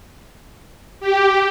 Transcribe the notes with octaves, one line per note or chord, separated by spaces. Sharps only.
G4